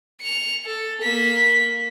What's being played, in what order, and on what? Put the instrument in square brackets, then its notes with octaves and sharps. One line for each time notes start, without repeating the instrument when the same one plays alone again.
[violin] C#7 F7
A4
A#3 B6